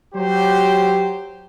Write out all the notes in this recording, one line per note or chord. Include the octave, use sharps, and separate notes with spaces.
F#3 G4 C5